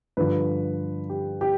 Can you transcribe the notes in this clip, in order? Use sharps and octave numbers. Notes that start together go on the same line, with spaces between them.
G2 D3 F3 B4
G4
G4